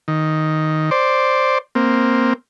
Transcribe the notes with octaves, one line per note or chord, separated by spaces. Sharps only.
D#3
C5 D5
A#3 C4